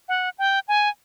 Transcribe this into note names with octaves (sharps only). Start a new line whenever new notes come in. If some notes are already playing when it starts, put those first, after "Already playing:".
F#5
G5
G#5